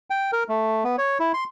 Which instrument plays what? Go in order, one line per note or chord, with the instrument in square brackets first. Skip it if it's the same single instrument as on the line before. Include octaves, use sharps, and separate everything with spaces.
[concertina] G5
A#4
A3
B3
C#5
E4
C6